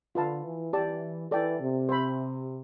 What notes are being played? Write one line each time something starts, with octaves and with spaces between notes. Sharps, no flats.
D3 F4 B4 F5 A5
E3
E3 G4 D5 A5
E3 A4 D5 G5
C3
C5 E5 B5